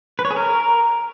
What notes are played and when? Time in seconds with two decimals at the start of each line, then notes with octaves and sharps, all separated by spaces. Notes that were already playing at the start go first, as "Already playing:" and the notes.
0.19 B4
0.25 C#5
0.31 G#4
0.36 A#4